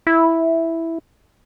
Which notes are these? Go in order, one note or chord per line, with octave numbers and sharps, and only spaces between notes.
E4